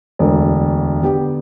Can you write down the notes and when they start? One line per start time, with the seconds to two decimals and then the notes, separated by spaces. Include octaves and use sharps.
0.19 E1 D2 D3
1.02 D3 B3 G4